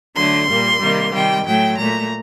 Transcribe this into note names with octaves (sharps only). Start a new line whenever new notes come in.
D3 F#3 A3 C6
A#2 G3 A#3
C3 D#3 G3 A#3
C3 D#3 G3 G5
A2 F#3 A3 G5
A#2 A3 A#5